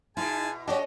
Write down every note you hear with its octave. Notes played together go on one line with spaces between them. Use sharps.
B2 D#4 E4 G#4 G#5 A5
C#4 F#4 G4 A4 C#5 D#5